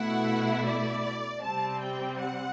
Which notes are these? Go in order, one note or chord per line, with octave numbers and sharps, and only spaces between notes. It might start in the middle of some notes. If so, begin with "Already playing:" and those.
Already playing: B2 A3 E4 F#5
D5
C3 G3 C4 A5
G5
F#5